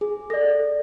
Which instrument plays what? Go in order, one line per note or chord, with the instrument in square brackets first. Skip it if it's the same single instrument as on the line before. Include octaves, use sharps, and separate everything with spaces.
[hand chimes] G#4
[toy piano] A4 D5 [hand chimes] A#6